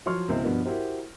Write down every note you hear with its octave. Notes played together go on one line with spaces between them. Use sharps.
F3 F#3 C#5 C6 C#6 F6
C#2 B2 C4 E4 C5
G2 B2 F3 B3 D4
E4 F#4 G4 A#4 C5